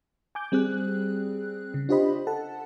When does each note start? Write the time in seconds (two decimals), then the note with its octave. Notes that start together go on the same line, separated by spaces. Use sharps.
0.35 G#5 D6 G6
0.52 G3 C4 G#4 F#6
1.74 C#3
1.89 D4 F4 G4 C5 D#5 B5
2.27 A4 F#5 A5